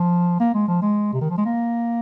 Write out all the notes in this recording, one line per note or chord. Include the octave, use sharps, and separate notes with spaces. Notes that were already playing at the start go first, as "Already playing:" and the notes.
Already playing: F3
A#3
G#3
F3
G#3
C3
D#3
F3
G#3
A#3